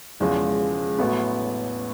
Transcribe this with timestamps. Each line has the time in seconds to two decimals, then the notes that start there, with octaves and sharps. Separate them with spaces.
0.20 E1 E2 C#3 F3 G#3
0.99 A1 A2 F#3 B3